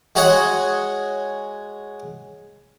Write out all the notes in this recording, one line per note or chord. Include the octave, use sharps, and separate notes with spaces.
G#3 F#4 G#4 C#5 D#5 F#5